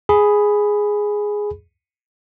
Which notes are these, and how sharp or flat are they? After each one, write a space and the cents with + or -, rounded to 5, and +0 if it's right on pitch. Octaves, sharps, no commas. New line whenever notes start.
G#4 +0 B5 +5